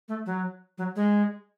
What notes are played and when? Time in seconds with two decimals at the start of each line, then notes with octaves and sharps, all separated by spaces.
0.08 A3
0.26 F#3
0.78 F#3
0.96 G#3